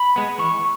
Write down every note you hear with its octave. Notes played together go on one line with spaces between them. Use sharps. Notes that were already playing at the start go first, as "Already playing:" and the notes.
Already playing: B5
G#3 B3
E3 C#6